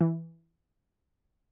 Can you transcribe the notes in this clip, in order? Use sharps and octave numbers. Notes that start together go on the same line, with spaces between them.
E3